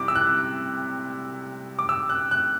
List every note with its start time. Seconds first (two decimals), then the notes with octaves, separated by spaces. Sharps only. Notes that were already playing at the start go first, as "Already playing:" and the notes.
Already playing: C3 G3 C4 E4 D6
0.08 E6
0.15 F#6
1.79 D6
1.89 E6
2.09 F#6
2.31 F#6